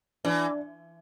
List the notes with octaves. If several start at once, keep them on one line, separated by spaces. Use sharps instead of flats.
E3 D4